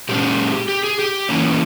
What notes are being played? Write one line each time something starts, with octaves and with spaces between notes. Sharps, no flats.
A#2 G#3 C#4 G4
G4
G#4
G4
E3 A#3 C#4